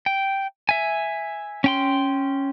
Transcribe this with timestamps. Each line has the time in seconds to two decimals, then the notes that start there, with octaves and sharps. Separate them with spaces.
0.06 G5
0.69 E5 G#5
1.64 C#4 G5 C6